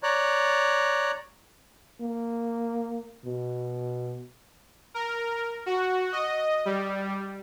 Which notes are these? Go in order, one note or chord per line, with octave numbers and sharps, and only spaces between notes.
C#5 D5 A#5 F#6
A#3
B2
A#4
F#4
D#5
G3